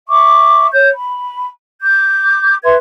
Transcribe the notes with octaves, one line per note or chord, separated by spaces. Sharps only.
E5 C#6 D6
C#5 G6
B5
D6 G6
B4 E5 C6 G#6